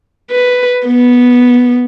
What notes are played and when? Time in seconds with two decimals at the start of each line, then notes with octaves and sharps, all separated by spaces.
0.31 B4
0.87 B3